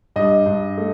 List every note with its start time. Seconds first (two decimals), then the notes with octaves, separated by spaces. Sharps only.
0.16 G2 D#5
0.46 G2
0.78 A3